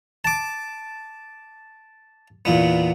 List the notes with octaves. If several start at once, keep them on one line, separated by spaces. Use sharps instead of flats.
A5 D6
E2 A#2 B3